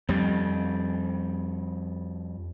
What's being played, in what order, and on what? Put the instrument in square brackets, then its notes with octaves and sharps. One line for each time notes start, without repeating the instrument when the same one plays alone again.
[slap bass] F2 G3